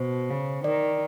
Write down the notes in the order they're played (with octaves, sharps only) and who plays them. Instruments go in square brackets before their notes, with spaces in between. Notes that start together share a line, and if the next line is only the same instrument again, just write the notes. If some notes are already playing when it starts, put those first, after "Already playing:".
Already playing: [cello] B2 [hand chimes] C5
[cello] C#3
[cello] D#3 [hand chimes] D5